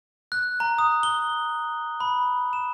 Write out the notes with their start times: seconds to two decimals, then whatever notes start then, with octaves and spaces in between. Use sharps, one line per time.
0.32 F#6
0.60 A#5
0.78 D#6
1.03 G7
2.00 B5
2.53 E7